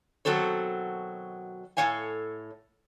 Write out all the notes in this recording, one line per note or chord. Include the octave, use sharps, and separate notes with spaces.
B2 D#3 F#3 C4 A4 C#5
A2 A4 C#5 F5 G#5